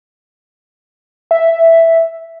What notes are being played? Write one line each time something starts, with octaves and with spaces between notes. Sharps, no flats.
E5